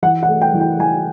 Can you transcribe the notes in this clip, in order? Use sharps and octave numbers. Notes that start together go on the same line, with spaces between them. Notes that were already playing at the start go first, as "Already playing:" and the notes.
E3 F#5
F#5
A3
G5
E3
G5
E3 G#5